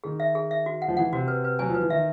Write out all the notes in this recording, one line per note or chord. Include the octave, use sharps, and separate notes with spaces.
D#3 G#4
E5
G#4
E5
F#4
F#5
F3
E3 F#5
C3 F#4
B4
B4
F#3 G#5
F3
B4
E3
D#3 E5